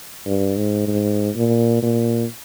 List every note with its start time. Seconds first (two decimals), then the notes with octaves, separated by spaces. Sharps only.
0.25 G2
0.57 G#2
0.87 G#2
1.35 A#2
1.83 A#2